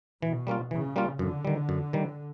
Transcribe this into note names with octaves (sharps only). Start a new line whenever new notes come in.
B2 E3
G3 A#3 C#4 F4
C#3 E3
G3 A#3 C#4 F4
F#2 D3
D#3 G3
F#2
D#3 G3